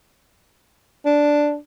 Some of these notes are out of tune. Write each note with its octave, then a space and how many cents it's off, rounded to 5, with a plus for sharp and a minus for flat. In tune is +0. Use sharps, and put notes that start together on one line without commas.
D4 +0